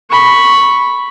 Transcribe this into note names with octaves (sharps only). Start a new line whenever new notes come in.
B5 C#6